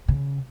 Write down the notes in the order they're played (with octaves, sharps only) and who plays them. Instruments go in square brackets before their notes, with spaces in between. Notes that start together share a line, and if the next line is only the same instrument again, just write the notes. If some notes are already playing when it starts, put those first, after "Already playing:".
[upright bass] C#3